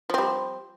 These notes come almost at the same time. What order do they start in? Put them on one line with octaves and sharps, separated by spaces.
F3 C4 G3